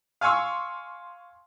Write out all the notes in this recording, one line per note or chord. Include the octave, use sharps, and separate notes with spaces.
F5 G#5 C6 C#6 E6